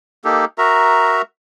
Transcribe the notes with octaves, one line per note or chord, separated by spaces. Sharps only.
A#3 D#4 G4 A4
F#4 A#4 E5 A#5